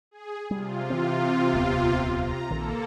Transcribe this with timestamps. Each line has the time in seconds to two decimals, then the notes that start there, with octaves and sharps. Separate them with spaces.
0.11 G#4
0.51 C3 G3 F4
0.90 E3 C4
1.53 D#1 C#2 B3
2.14 A#5
2.51 A#1 D#3 A#3 A4